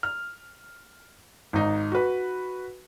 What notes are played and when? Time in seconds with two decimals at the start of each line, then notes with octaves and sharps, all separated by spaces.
0.03 F6
1.53 G#1 D#4
1.92 F#4 B4